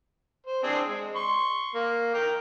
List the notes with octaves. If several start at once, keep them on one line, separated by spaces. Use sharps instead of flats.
C5
C4 D4 G#4
G#3
C6 C#6
A#3
A#4 G5